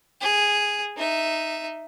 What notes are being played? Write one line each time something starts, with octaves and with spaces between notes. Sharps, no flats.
G#4
D#4 E5